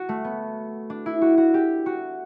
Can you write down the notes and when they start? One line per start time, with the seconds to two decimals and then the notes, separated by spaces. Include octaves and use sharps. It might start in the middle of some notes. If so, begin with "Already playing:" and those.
Already playing: F#4
0.09 A3
0.24 B3
0.90 D4
1.06 E4
1.22 F#4
1.37 F#4
1.54 G4
1.86 F#4